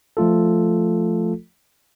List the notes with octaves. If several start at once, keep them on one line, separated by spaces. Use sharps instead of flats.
F3 A3 F4 A4